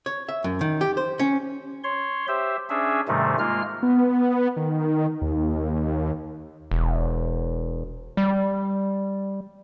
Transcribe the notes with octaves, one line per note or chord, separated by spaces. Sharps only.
C#5
E5
F#2
D#3
G4
C5
C#4
C#5 C6
G4 C5 E5
C#4 D4 G#4 E5
G#2 C3 D#3 G3 A3
G#3 A#3 F4 F6
B3
D#3
D#2
E1
G3